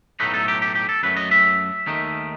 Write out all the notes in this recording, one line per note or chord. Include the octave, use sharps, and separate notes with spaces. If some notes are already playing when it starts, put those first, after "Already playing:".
B1 A2 F#3 A3 D#4 B4
A4
G4
G4
G4
A4
F#2 F#3 A3 B4
D#5
E5
D#2 D#3 A3 D#4